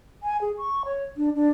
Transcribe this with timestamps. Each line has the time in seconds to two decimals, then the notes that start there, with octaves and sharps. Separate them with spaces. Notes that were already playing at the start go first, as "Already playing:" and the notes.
0.23 G#5
0.41 G#4
0.58 C#6
0.85 C#5
1.17 D4
1.35 D4